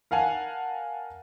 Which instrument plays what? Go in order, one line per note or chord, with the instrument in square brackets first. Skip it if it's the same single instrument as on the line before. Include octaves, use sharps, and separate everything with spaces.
[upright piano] A#4 F5 F#5 G#5 A5